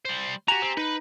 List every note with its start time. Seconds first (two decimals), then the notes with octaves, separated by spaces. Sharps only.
0.05 G3 C5
0.48 F#4 G4 G#5 A#5
0.62 C4
0.77 D#4 B4 B5